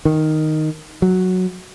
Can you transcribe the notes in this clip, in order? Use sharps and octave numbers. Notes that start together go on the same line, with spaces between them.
D#3
F#3